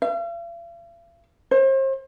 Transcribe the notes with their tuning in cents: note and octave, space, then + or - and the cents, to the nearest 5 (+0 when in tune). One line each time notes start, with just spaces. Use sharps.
F5 -45
C5 +40